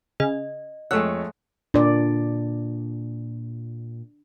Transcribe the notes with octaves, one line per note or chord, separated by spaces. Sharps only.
C#3 D#5
F2 G#3 A3 C#5 F#5 E6 F#6
A#2 D4 D5